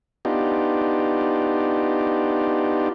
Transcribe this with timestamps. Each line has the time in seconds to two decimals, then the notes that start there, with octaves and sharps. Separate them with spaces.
0.25 B3 D4 D#4 F4 G4